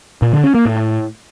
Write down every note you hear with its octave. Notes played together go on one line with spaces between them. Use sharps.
A#2
D3
C#4
A#3
A2